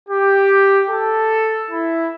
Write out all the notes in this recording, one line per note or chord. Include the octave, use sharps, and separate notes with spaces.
G4
A4
E4